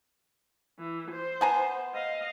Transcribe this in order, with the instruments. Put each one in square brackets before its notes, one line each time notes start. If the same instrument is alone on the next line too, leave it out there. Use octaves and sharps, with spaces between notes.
[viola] E3
C5
[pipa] B3 G#5 A#5
[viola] D#5 F5